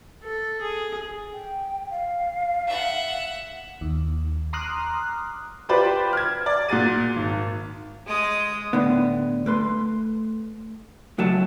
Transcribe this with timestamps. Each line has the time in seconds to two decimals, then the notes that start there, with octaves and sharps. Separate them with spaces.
0.23 A4
0.61 G#4
1.33 G5
1.91 F5
2.67 E5 F#5
3.81 D#2
4.53 A#5 C6 D6 D#6 F6 F#6
5.69 F4 G4 B4 C5 D5
6.13 F6 G#6
6.46 D5
6.69 A#2 F#4 G#4 A6 D#7
7.16 G#1
8.07 G#3 D#6
8.73 A2 D3 B3
9.46 A3 B4 C6
11.18 C#2 F#3 A3 A5